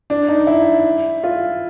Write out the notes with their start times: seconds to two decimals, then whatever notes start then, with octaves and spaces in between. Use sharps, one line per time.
0.10 D4
0.29 D#4
0.47 E4
1.24 F4